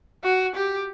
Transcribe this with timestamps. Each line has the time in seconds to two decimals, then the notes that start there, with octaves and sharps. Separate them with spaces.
0.24 F#4
0.56 G4